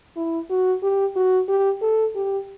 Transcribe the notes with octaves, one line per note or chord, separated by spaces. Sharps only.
E4
F#4
G4
F#4
G4
A4
G4